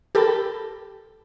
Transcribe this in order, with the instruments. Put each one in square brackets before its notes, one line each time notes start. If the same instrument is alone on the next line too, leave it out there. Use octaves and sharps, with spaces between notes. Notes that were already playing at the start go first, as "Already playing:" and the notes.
[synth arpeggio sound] G4 A4 A#4 G5 A5 B5